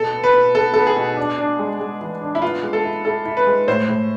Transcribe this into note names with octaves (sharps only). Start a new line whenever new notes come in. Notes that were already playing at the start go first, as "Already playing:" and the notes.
Already playing: B2 A4
B3
B4
B2
B3 A4
B3 A4
G#4
B2
D4
D4
G#3
G#3
E3
D4
E4
B3 F4
G#3
A4
E4
E4 A4
E4
B4
G#3
A2 C5
A2